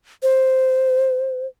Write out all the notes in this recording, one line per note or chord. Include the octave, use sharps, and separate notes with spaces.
C5